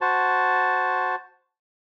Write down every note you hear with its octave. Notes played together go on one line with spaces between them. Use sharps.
F#4 C5 A5